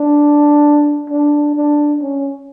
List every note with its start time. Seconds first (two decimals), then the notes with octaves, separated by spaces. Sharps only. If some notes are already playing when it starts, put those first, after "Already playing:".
Already playing: D4
1.10 D4
1.55 D4
2.01 C#4